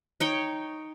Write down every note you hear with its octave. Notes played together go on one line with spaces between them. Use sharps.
D#4 C#5 G5